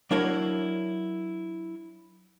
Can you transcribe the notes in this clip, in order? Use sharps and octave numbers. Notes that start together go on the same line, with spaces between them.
F#3 D4 E4 A#4 C#5 D5